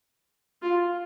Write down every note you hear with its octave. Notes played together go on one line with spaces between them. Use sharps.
F4